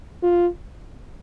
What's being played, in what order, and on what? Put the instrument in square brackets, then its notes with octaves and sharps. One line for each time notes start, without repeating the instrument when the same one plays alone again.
[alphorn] F4